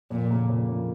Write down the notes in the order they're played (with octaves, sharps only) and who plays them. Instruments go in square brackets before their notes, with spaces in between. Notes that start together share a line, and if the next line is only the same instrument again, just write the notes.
[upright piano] F2 [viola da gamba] A#2
[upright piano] C#3 F3 A#3
F2
C#3 F3 A#3